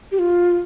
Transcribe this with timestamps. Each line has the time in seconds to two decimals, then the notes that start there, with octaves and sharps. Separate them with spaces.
0.12 G4
0.19 F4